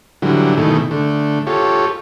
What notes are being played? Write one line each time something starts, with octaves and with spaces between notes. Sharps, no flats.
D3 E3 F#3 G3
B2 D#3 E3 A3
D3 A3
F4 G4 A4 C#5